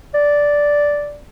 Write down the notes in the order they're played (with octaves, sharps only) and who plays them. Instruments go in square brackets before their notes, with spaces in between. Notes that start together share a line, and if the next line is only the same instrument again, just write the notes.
[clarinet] D5